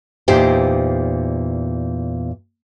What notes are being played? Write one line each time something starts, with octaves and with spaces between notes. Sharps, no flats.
E2 A#2 D#4 G4 C5